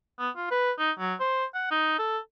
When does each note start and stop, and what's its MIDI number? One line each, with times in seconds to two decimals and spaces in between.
0.20 0.30 59
0.37 0.49 65
0.51 0.72 71
0.79 0.91 63
0.99 1.14 54
1.20 1.45 72
1.54 1.67 78
1.71 1.98 63
1.99 2.18 69